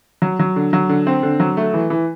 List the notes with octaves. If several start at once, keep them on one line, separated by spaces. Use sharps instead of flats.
F#3
F#3
D3
F#3
D3
C4
D3
F#3
A3
E3
E3